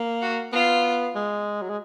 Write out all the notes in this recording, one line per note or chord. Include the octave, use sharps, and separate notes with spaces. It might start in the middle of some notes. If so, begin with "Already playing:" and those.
Already playing: A#3
F#4
B3 F4
G#3
F#3
G#3